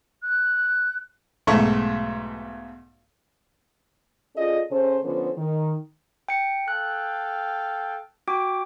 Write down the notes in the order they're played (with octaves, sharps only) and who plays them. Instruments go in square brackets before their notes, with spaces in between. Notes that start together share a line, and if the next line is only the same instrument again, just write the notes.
[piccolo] F#6
[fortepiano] B1 G#2 A3 E5 C#6
[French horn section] C#4 F4 G#4 A4 D5 D#5
C#3 C#4 A4 C5
D3 F3 B3 C#4 A4 C5
D#3
[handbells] G5 C#7
[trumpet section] A4 F5 G5 [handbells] F#6
[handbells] F#4 G5 D6